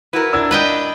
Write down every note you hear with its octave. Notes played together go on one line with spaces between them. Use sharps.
E4 F#4 A#4 B4
D4 E6 G#6
B4 D#5 G5